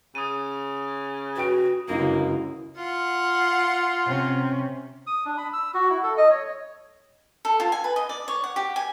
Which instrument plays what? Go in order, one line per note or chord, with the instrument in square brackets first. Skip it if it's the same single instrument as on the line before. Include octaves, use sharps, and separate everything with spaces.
[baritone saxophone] C#3 [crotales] D#6 D#7
[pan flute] F#4 [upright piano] B4 G5 D7
[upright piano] G1 C#2 F#2 [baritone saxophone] A#3 [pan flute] E4
[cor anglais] F4 [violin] F#5
[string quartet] C3 C#4
[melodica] D#6
D4
B5
E6
F#4
E4
A4
D#5
C#5
[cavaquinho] A4
F4
G#5
B4
D#5
D5
C#5
F#5
G4
G#5